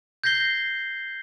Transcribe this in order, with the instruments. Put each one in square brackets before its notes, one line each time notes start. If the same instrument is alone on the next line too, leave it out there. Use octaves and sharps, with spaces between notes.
[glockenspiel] G6 G#6 A#6 C7 G7